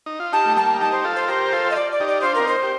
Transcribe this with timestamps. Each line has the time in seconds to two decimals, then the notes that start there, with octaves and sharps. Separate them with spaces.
0.06 D#4
0.20 F4
0.33 D#4 G4 A5
0.46 A3
0.57 G3 A#3 A5
0.80 D#4 G4 A5
0.92 C5
1.05 F4 A4
1.16 C5
1.28 G4 A#4 C5
1.53 F4 A4
1.71 D#5
1.76 D5
1.92 D5
2.00 D#4 G4
2.08 D5
2.21 D4 F4 C5
2.35 C4 D#4 A#4
2.48 C5
2.63 G4